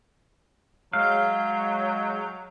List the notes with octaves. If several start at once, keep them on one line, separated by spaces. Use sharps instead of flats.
F#3 G#3 C#5 F5 G6